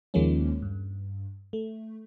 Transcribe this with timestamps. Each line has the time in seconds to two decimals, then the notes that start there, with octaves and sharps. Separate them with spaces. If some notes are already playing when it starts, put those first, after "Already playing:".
0.14 D#2 D#3 F3 G#3 A#3 C#4
0.62 G2
1.53 A3